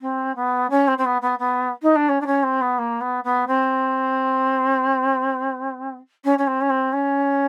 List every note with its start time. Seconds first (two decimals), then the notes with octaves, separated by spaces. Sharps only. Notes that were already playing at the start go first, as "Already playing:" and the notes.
0.01 C4
0.36 B3
0.70 C#4
0.87 C4
0.98 C4
1.05 B3
1.22 B3
1.39 B3
1.82 D#4
1.96 D4
2.09 C#4
2.21 D4
2.26 C#4
2.43 C4
2.61 B3
2.78 A#3
3.01 B3
3.24 B3
3.47 C4
6.24 C#4
6.38 C#4
6.47 C4
6.61 C#4
6.70 C4
6.93 C#4